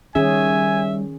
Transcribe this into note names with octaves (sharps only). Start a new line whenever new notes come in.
D#3 G3 C#4 G#4 E5 G#5